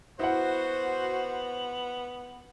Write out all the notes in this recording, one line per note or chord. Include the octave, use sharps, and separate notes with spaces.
B3 E4 F#4 C5 F#5